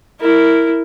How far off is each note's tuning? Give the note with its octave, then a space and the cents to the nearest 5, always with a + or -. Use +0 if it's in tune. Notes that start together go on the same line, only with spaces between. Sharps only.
E4 +0 A#4 -10